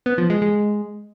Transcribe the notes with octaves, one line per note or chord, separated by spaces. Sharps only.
B3
F3
G#3
G#3